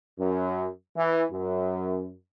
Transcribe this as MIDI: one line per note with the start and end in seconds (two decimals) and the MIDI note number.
0.17 0.66 42
0.96 1.23 52
1.30 2.13 42